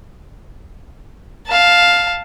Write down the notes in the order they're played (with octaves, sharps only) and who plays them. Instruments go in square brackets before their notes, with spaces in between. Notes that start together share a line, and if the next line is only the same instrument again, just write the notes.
[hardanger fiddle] F5 A5